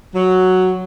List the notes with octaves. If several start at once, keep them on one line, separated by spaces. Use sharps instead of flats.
F#3